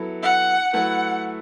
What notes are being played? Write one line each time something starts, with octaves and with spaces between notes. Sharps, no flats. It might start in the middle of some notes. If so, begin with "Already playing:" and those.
Already playing: F#3 B3 E4 A4
F#5
F#3 A3 E4 B4 F#5